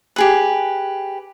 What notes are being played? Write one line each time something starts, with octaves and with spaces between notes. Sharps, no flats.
G4 G#4 B4